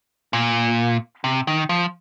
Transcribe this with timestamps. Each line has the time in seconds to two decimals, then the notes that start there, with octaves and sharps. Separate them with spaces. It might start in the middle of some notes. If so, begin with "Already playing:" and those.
0.33 A#2
1.24 C3
1.47 D#3
1.69 F3